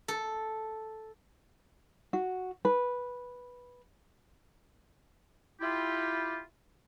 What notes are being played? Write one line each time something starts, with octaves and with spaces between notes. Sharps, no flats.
A4
F#4
B4
E4 F4 G4